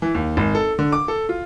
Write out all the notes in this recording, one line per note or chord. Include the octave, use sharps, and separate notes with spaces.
E3
D#2
G#1
A4
D3
D6
A4
F4